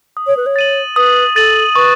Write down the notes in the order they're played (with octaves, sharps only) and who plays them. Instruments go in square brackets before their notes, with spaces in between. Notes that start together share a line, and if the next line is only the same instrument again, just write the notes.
[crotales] D#6
[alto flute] C#5
B4
C#5
[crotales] A6 D#7 F#7
[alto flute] B4 [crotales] D#6
[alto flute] A4 [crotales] A6 D#7 F#7
[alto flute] B4 [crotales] C#6